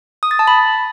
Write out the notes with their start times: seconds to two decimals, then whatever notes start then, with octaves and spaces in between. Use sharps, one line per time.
0.23 D#6
0.31 A6
0.39 A5
0.48 B5